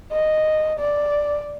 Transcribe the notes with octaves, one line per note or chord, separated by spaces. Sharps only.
D#5
D5